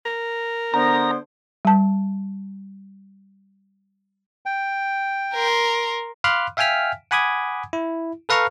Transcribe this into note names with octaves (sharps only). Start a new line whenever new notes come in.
A#4
D3 B3 C5 A#5
G3 A5
G5
A#4 C6
F5 B5 C6 D6 F6 F#6
E5 F5 G5 G#5 F6 B6
F#5 G#5 B5 D6 D#6 G#6
E4
A4 B4 F5 A#5 C#6 F6